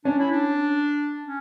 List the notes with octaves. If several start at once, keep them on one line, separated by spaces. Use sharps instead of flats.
C#4 D4
E4
D4
C#4